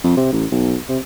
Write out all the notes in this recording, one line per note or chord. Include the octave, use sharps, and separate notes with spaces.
F2
C3
A1
B1
C3